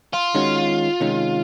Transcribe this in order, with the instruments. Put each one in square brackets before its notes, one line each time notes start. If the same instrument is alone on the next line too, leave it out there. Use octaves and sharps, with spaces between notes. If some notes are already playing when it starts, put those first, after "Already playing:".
[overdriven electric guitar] F4
[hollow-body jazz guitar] D#3 G#3 C#4 F#4
C3 D#3 G#3 C#4